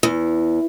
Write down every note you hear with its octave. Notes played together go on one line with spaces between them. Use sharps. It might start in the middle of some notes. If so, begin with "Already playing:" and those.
E2